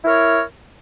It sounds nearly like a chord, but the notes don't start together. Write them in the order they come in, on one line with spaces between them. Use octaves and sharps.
E4 A#4 C#5